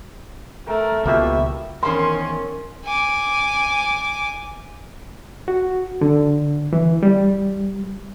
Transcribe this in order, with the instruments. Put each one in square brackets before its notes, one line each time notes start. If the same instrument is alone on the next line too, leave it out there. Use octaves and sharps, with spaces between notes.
[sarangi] A3 [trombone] A#4 [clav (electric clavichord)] G5
[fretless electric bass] C#2 [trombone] B2 [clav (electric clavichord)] A#3 F4 G4 [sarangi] E5
[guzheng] E2 D#3 C5 [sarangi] C#4 [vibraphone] A#4 [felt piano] C6
[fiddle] G#5 D6
[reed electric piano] F#4
D3
E3
G3